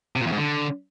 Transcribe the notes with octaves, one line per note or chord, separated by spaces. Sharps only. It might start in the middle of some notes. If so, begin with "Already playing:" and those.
C3
A#2
E2
G#2
D3